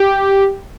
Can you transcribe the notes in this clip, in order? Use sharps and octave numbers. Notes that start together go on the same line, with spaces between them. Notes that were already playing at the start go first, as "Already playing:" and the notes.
Already playing: G4